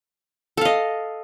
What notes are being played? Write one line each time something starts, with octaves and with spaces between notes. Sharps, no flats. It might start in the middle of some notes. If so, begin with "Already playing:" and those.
A4 D#5 F5